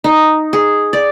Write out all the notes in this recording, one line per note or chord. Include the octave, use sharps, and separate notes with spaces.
D#4
G#4
D5